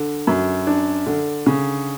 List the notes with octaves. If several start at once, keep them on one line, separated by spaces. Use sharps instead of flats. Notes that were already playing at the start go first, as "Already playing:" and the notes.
Already playing: D3
F#2
D4
D3
C#3